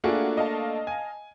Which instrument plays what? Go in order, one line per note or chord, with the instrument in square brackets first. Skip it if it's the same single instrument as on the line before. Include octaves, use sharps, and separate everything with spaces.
[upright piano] A3 A#3 D4 [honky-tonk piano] F4 F#4 G#4
[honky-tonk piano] D#5 F5 A5
[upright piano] G#5